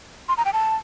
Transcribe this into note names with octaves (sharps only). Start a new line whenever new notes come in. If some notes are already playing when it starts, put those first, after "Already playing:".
C6
A#5
G5
A5